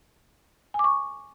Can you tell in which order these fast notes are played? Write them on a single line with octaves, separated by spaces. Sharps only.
G#5 D6 C#6